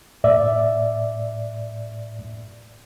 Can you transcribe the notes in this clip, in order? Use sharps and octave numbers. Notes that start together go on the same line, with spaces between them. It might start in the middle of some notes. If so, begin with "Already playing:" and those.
A2 D5 E5